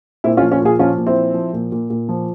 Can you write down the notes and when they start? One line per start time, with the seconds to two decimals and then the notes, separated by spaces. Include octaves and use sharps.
0.24 A#2 C4 E4
0.37 C#4 F4
0.42 F3
0.51 C#4 F4
0.61 A#2 F4 G#4
0.79 F3 C#4 F4
0.98 A#2
1.06 C4 E4
1.16 F3
1.34 F3
1.53 A#2
1.72 A#2
1.90 A#2
2.09 F3